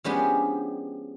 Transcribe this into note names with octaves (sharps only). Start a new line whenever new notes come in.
F3 G#3 B3 C#4 D4 G4